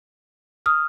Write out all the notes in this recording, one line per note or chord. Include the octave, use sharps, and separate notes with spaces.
D#6 F6